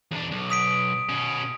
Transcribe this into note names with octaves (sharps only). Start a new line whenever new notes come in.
E2 D4
B1
D#6 B6 D7
B2 C#4